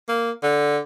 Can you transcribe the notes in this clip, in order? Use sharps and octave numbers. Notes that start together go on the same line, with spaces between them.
A#3
D3